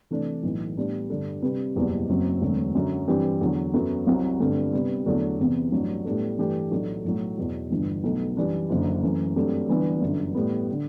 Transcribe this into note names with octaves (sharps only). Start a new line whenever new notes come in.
C3 E3 A3 D4
B1 A2 E3
A2 G3 B3 D4
G2 D3 G3 D4 A4
C3 G3 D4 G4 B4
F#1 E2 B2 G3 B3
F#1 F#2 F#3 C4
E1 D2 D3 F#3 C4
F#2 D3 F#3
G2 E3 G3 C4 G4
E2 D3 F#3
F#2 F#3 B3 F#4 A4
C2 C3 F#3
G1 G2 D3 A3 C4
C3 G3 B3
E2 D3 F#3 A3 D4
E2 C3 E3 B3
A1 G2 F#3
A2 G3 B3 D4 A4
G2 E3 A3 D4 G4
B1 A2 F#3 A3 D4
B1 A2 F#3
E2 B2 F#3
G1 G2 E3
B1 B2 A3
F#2 E3 G3 D4
F#1 F#2 D3
F#2 E3 A3
G2 F#3 A3 C4 G4
G1 G2 E3 B3
G1 F#2 D3
A2 G3 B3
D3